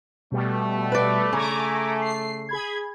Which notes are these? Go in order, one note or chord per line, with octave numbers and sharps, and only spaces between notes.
B2 G3 A3
B4 D5
C#3 G#5 A#5 D6
C7
G#4 B5 G#6